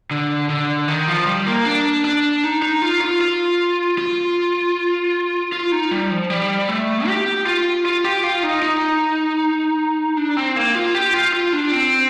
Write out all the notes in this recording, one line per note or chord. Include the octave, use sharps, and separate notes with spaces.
D3
D3
D#3
F3
G3
A#3
D4
D4
D#4
D#4
F4
F4
F4
F4
F4
D#4
G3
F3
G3
A3
G4
F4
F4
G4
F4
D#4
D#4
D4
C4
A#3
F4
G4
F4
F4
D4
C4